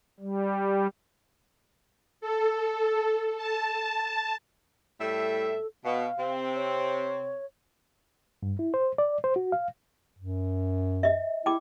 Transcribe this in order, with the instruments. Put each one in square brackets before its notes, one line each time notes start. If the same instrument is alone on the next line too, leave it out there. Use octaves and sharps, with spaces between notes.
[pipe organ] G3
[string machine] A4
A5
[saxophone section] A2 G3 E5 [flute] A4
[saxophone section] B2 [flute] F5
[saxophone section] C3 C4
[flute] C#5
[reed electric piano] G2
E4
C5
D5
C5
F#4
F5
[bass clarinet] F#2
[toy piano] D#5 E5
[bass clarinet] E4 [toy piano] G5 D6